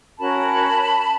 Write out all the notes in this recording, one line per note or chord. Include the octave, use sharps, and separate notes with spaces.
C#4 F#4 A#4 A5 B5